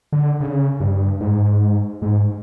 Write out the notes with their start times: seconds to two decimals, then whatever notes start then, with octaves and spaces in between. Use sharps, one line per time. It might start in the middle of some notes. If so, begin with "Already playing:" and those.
0.13 D3
0.40 C#3
0.80 G2
1.21 G#2
2.02 G#2